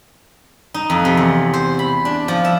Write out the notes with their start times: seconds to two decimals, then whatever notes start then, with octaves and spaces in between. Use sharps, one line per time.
0.74 D#4
0.90 F2
1.05 C3
1.17 E2
1.54 C5
1.79 B5
2.05 D4
2.28 F3
2.45 E5